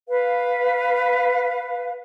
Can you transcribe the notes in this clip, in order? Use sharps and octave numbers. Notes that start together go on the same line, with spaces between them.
B4 F5